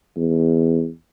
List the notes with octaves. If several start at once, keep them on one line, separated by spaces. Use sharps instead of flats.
E2